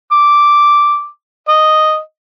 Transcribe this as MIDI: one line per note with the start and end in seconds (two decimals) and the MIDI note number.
0.12 1.08 86
1.49 1.99 75